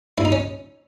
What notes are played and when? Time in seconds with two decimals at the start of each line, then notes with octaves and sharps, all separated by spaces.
0.18 G2 E4
0.25 D#4
0.32 C#4